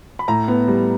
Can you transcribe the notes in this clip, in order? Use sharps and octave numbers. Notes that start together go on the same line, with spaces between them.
B5
A2 A#5
B3
G3